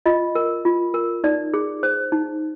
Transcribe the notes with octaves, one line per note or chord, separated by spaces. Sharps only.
F4 D#5
A#4
F4
A#4
D#4 D5
G#4
C5
D#4